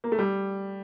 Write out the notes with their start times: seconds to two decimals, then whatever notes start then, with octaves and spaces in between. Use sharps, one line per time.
0.04 A#3
0.12 A3
0.19 G3